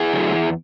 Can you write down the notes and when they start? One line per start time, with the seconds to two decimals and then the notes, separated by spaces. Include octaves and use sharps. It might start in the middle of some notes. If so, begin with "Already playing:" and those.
Already playing: E4 G#4
0.13 D3 F#3 A3
0.32 E2